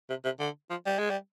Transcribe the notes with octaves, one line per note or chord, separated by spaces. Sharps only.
C3
C3
D3
F3
G3
G#3
G3